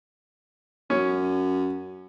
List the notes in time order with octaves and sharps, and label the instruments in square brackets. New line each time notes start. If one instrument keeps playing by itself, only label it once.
[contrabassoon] F#2 [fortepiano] C#4